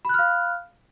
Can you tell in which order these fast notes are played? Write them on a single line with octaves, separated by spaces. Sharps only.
B5 F#6 F6 F5